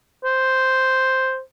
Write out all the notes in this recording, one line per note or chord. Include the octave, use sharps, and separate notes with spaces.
C5